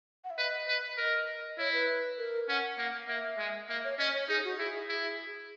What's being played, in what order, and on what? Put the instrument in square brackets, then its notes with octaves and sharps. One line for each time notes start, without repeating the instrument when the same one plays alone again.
[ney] F#5
E5
[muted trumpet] B4 [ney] D#5
[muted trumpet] B4
[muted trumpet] A#4 [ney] D#5
[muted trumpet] E4 [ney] C#5
[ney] B4
A#4
[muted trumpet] C#4 [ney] F#5
[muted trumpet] A#3
[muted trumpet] A#3 [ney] E5
[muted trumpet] G#3
[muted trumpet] A#3 [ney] E5
[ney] C#5
[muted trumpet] C#4 [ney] D#5
[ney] C#5
[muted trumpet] D#4 [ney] G#4
[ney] F#4
[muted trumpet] E4 [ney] G#4
[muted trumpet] E4 [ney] G#4